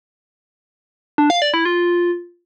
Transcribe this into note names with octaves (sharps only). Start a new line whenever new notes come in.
D4
F5
D5
E4
F4